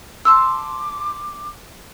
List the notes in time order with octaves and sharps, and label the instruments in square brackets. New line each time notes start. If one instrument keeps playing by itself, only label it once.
[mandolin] A5 C6 F6 [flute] D6 [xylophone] E6